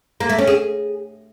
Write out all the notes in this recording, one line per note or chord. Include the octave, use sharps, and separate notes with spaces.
A#3
A3
C#4
G#4